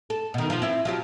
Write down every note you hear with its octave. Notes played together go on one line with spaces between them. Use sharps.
A4
B2 D#3
F3
C4 E4
F3 F#3 G4